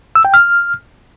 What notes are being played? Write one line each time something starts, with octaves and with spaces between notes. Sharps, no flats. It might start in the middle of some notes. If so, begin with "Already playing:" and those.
E6
G5
F6